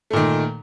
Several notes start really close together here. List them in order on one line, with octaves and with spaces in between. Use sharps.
A3 A#2 D#3